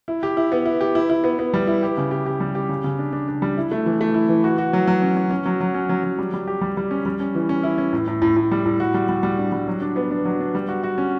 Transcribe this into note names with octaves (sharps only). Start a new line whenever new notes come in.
E4
G4
E4
B3
E4
G4
E4
E4
B3
B3
G3
E4
G4
C#3
G4
G4
G3
G4
C#3
C#3
D4
D4
D4
G3
E4
A3
E3
A3
E4
E3
F#4
F#4
F#3
F#3
C#4
C#4
C#4
F#3
F#3
C#4
F#3
F#3
G3
G3
G4
G3
G3
C#4
G3
C#4
E3
C#4
E4
C#4
A2
A2
A2
A2
G3
A2
F#4
G3
G3
G3
D4
G3
F#3
D4
B3
D4
F#3
D4
G3
F#4
F#4
C#4